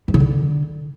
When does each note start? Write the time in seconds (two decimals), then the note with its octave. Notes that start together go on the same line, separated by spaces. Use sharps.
0.08 G2
0.14 C#3
0.20 D3